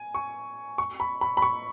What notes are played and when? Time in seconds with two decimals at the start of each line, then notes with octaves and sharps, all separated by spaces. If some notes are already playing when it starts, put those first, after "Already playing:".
Already playing: G#5
0.15 C#6
0.78 C#6
1.00 B5
1.21 B5
1.37 B5
1.42 C#6